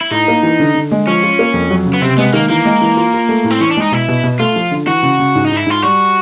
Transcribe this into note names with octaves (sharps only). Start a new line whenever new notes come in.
E4
A2 D#4
A#3
E3
D3
D3
G#3
F3 C#4
F4
A#3
F2
F#3
C#3
B3
C3 C4
G#3 B3
D#3 A#3
E3 A#3
G#3
E3
F4
F4
A3
A2
C4
E3 C#4
D4
G#3 D#4
B2 E4
B2
B2
A3 F4
F3
D3
E3 F#4
C#3
C#3
G#2
D#4
G#2
E4
G#2 F4
G3 F#4